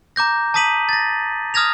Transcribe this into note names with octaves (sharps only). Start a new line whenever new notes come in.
A#5 D6 G6 A#6
A5 A#5 D#6 B6 D#7 F#7
A6 A#6
D#6 F6 G#6 A#6 F7